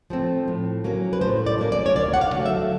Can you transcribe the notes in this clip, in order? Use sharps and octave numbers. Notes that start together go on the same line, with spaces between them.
F3 A3 C4
A2
F#3 A#3 C#4
B4
A2 C5
D5
F#3 A#3 C#4
D5
C#5
D2 D5
F#5
F5
D3 F#3 A3
E5